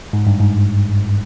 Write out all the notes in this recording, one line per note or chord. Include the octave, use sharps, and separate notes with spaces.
G#2
G2
G#2